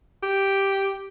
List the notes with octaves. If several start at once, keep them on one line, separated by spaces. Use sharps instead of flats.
G4